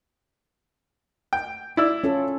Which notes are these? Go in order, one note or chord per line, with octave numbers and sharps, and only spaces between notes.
G5
E4 D5 E6
C#4 F4 A4